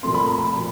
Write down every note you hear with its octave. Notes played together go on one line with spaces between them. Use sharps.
A#2 F3 A3 C4 C6
B5
A#5
B5
A#2 F3